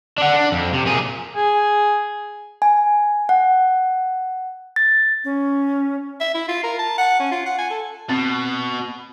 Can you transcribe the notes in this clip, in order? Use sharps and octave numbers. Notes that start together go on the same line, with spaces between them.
D4 F#5
D4
F2
C3
A#2 G#4
G#4
G#5
F#5
A6
C#4
E5
E4
F4
A#4
A5
F#5
C#4
F4
F#5
G#5
A4
B2 C4